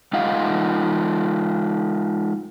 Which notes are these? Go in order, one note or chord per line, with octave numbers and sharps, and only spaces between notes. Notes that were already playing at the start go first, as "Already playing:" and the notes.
G#3 D#4 F4 D#5 F5 F#5